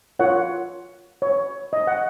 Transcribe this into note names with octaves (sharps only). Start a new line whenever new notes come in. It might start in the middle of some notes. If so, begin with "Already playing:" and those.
F4 A#4 C#5 F#5
C#5
D#5
F#5